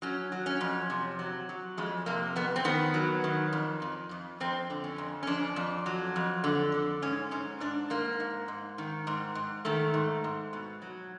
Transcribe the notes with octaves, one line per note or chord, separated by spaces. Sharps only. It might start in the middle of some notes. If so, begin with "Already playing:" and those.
F#3 C#4
F#3
C#4
F2
C3
F#3
F#3
F2 G#3
C3 A#3
F2 B3
C4
D#3 B3
F#3
D#3
F2
F2
F2
F2 C4
D3
C#4
F2
C#4
F2 D4
F2
F#3
F2
D3
D3
G#2 C#4
G#2 C#4
G#2 D4
G#2 A#3
G#2
G#2
D#3
G#2
G#2
D#3 A3
G#2
G#2
B2
F#3